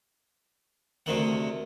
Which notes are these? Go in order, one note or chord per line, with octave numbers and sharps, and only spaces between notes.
D2 C3 D#3 F#5